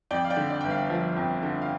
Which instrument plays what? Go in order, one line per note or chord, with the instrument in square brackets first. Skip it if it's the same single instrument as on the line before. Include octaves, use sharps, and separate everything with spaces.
[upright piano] F2 D5 G5
F5
D5 G5
D3
D5
G1 G5
F5
F3
F2
D3
F5